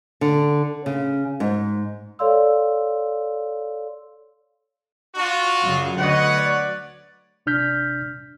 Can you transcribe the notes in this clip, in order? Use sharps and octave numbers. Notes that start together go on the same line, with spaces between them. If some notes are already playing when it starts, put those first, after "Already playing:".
D3
C#3
G#2
A4 C#5 D5 F5 C6 E6
D4 F4 F#4
F#2 C#3
D2 F#3 B4 C#5 D#5 F#5
D5
G#1 C3 D4 F6 G6 B6